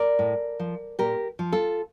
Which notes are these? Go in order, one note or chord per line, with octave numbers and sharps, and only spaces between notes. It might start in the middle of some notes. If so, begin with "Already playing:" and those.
Already playing: A#4 D5
A2
F3
A#2 G4 A#4
F3
F4 A4